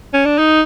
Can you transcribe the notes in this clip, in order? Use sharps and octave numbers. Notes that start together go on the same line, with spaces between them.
C#4
D4
D#4